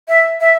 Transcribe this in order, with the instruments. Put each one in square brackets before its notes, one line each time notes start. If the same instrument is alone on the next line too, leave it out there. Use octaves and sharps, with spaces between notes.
[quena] E5
E5